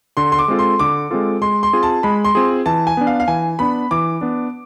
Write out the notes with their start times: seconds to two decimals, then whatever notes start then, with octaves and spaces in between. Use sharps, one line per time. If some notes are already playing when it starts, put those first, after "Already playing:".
0.17 D3 C6
0.32 C6
0.39 D6
0.48 G#3 C4 F4 A4
0.59 C6
0.79 D3 D6
1.11 G#3 C4 F4 A4
1.41 G#3 C6
1.63 C6
1.73 C4 F4 G#4
1.83 A5
2.03 G#3 B5
2.25 C6
2.35 C4 F4 G#4
2.66 E3 A5
2.87 G#5
2.97 B3 D4
3.07 F5
3.20 F5
3.28 E3 G#5
3.59 B3 D4 B5
3.91 E3 D6
4.21 B3 D4